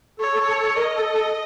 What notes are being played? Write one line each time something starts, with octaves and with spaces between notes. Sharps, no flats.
A4 C#5
A4
A4
A4
A#4 D#5
A4
A4